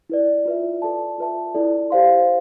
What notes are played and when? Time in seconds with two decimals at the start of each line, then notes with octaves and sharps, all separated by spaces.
0.10 E4 B4 D5
0.46 F4 B4 E5
0.82 A4 D5 A5
1.18 F4 B4 E5 A5
1.54 E4 A4 D5
1.90 G4 C5 F5 C6